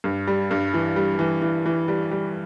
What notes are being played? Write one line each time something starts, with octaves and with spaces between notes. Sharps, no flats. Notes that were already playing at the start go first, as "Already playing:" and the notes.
G2
G3
G2
E3
G3
E3
E3
E3
G3
G3